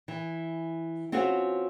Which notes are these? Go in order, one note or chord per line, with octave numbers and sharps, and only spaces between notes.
E3
C4 C#4 F4 F#4 B4 C5